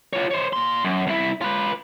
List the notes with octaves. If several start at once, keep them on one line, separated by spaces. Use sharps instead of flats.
F4 C#5
C5 C#5
A#2 C6
F#2
C2 E4
F4 B4